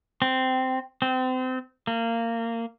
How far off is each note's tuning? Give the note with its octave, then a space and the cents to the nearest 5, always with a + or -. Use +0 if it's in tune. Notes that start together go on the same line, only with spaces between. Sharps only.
C4 -10
C4 -30
A#3 -20